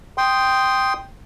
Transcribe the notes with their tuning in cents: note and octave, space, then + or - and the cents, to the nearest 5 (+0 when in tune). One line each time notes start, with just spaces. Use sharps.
G5 +0 C6 +0 D#6 +0